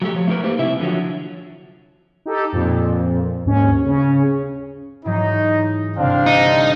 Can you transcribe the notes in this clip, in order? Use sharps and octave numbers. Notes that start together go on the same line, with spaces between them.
F#3 A3 G4
F3 C#5
A3 D#4 G#4 A#4 B4
A3 A#3 G4 C5
C3 E4 E5
D3 F3 F#3
D#4 G4 A4
F2 A#2
D#2 G#2 C#4
C#3 C#4
G#2 E3 F#3 D#4
G1 C3 C4 D4 F5
D#4